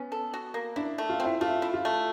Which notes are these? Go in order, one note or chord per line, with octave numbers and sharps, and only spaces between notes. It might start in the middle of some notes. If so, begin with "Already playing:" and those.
Already playing: B3 C#4
A4
F#4
A#3
D4 E4
A3
F4
C4
E4
A3 F4
E4
F4
A3